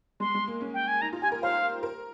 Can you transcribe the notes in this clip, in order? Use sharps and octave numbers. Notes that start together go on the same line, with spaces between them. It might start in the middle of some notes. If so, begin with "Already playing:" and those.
G#3 C6
G#3
A#3
C#4
G5
G#5
D#4 A#5
F4
G4 G#5
A#4
C5 F5
A#4